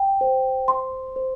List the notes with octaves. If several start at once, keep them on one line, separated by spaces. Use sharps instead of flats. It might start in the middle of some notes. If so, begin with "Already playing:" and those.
Already playing: G5
C5
C6
C5